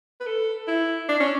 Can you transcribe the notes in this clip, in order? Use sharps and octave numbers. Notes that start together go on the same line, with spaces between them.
B4
A4
E4
D4
C#4